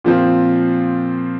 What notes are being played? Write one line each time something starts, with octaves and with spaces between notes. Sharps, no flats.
A#2 F3 C4 F4